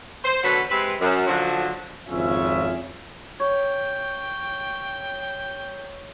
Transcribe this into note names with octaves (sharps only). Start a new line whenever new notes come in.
C5
B2 D3 F#3 F#4 A4 B4
C3 G#3 C4 B4
F#2
D3 F3 F#3
G#1 F2 C#3 C#4 F4 E5
C#5 G5